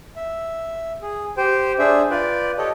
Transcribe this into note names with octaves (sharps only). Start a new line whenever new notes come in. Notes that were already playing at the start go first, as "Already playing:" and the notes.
E5
G#4
G4 C5 G5
D4 G#4 C5 E5
F4 B4 D5 G5
G4 A4 C#5 D#5